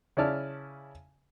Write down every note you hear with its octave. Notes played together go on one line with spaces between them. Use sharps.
C#3 C#4 E4 D5 A5 F6